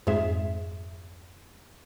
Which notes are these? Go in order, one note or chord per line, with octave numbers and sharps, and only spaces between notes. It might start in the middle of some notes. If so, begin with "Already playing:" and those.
F2 G#2 G#3 G#4 E5